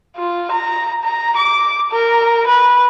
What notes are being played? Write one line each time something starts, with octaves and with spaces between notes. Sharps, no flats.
F4
A#5
A#5
D6
A#4
B4